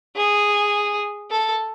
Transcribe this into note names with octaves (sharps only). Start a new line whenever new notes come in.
G#4
A4